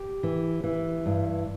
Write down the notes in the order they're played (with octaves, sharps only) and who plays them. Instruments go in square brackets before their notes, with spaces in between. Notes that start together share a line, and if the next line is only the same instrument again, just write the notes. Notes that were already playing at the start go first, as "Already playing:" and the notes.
Already playing: [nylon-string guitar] G4
E3
E3
G2